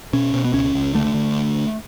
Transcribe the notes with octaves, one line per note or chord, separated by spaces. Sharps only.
B2 C#4
B2
B3
C#2 C#4
C#2
D3 A3
D3